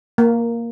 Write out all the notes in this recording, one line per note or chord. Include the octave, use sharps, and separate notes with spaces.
A#3